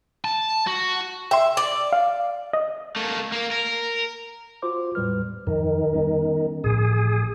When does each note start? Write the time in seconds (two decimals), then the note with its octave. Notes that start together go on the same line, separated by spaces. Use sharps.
0.24 A5
0.67 F#4
1.31 E5 G5 C6
1.57 D5
1.92 F5
2.53 D#5
2.96 A3 A#3
3.32 A#3 A#4
3.51 A#4
4.62 F4 F#4 C5 C6 D6
4.95 E2 A2 G3 B4 F6
5.47 F2 D#3
5.94 G3 B3 C#4
6.64 A1 A2 F3 G#4